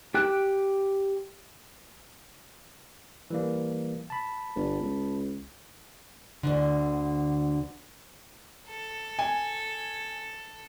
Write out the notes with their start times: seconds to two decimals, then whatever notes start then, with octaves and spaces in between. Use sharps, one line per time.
0.14 G4 G5 F#6
3.30 E3 G3 A#3
4.10 A5 B5
4.56 G1
4.81 C#2
6.43 D2 G2 D3
8.67 A4
9.19 G#5